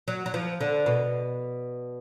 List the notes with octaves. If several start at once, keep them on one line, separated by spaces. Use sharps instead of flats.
F#3
F#3
F3
D3
B2